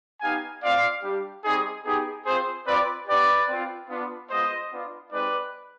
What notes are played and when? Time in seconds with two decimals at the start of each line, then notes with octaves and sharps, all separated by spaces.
0.21 B3 D#4 G4 F5 G#5
0.62 C4 F4 D5 F5
1.03 G3 D4 G4
1.44 G3 C4 D#4 G#4
1.85 B3 D#4 G4 G#4
2.25 C4 F4 G#4 C5
2.66 C4 F4 B4 D5
3.07 B3 D4 G4 B4 D5
3.48 C4 F4
3.89 B3 D4 F4
4.29 G#3 B3 F4 C5 D#5
4.71 B3 D4 F4
5.11 G#3 C4 D#4 G4 B4 D5